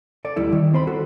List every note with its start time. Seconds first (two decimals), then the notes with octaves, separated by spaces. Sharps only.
0.25 A4 D5
0.36 D2 G3 E4 A4
0.52 D#3
0.73 C4 C5 B5
0.87 F#4 A4